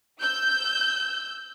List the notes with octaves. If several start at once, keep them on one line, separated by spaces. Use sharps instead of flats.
E6 G6